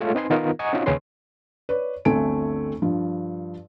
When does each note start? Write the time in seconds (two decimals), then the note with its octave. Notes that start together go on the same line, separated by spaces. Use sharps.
0.01 G#3 A3 F4 A4 C#5
0.15 C4 D#4 B4 G#5 C6
0.30 D#3 B3 D#4 F4 A#4 B4
0.59 D#5 F#5 G#5 A#5 C#6
0.73 C4 C#4 D#4 F4 F#4
0.86 D#2 C#3 C#4 B4 C6
1.69 B4 C#5 D5
2.05 G1 D2 A3 C4 G#5 D7
2.82 G2 F3